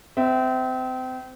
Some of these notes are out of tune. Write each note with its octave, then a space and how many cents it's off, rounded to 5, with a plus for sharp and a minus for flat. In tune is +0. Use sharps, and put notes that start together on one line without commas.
C4 -30 E5 +0